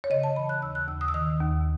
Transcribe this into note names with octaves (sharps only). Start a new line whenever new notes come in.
C#5
C#3 D#5
A5
E3 B5
F#6
D#2 E6
F#6
D#2 E6
D#6
E6
D#3 D#6
D#2